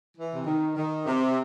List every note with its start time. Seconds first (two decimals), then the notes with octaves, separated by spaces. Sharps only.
0.17 E3
0.35 C3
0.47 D#3
0.76 D#3
1.06 C3